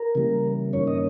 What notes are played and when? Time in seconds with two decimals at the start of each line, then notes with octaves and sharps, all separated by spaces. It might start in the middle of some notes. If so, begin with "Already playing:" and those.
Already playing: A#4
0.15 C#3 E3 G3 A#3
0.73 G2 D#3 A#3 C#4 C#5
0.88 D#5